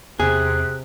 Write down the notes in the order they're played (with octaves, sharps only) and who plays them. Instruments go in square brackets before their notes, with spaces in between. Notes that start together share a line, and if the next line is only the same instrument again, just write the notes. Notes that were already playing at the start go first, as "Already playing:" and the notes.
[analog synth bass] E2 [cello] C3 [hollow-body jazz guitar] G#4 [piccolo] F#6